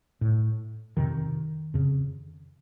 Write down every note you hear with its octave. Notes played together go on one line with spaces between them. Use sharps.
A2
F2 C3 D#3
F2 C#3